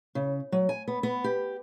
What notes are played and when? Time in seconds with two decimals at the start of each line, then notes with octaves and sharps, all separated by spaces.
0.15 C#3
0.52 F#3
0.69 G#5
0.88 B3
1.03 B3
1.24 G4